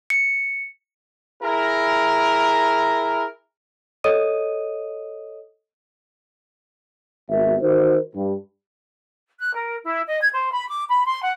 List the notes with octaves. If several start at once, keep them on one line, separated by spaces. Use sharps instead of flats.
C#7
E4 G#4 A#4
A4 C#5 D#5 D#6 D#7
G#1 B3 F#4 A#4 E5
D#3 D#4 F#4 A#4 C5
G2
F#6
A#4
E4
D#5
G#6
C5
B5
D6
B5
C6
F#5